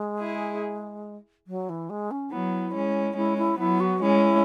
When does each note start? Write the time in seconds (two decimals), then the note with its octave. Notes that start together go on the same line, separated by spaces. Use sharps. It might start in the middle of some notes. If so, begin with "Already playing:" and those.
Already playing: G#3
0.19 E4 G#4
1.47 F#3
1.69 E3
1.90 G#3
2.11 C#4
2.32 F#3 B3 E4
2.74 G#3 C#4
3.16 G#3 C#4 E4
3.38 E4
3.59 F#3 B3 E4
3.80 F#4
4.02 G#3 C#4 E4